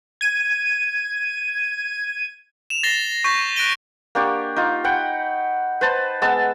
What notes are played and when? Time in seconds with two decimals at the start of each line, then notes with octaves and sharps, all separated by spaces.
0.21 G#6 D#7
2.70 E7 F7
2.83 A6 A#6 C7 G7
3.24 C#6 G6 A6 B6
3.56 F#6 A#6 D7 D#7 G7
4.15 A#3 D4 G4 C#5
4.56 D#4 F4
4.84 F#5 G5 B5
5.81 B4 C5 A5
6.22 G#3 B3 A5 E6